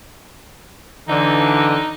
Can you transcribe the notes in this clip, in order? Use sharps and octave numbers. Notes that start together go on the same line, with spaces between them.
D3 E3 D#4